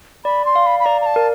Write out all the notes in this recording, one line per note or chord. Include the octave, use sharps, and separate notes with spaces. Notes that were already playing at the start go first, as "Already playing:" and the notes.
D5 B5
C6
F5
B5
B5
D5 A#5
A#5
A5
A#4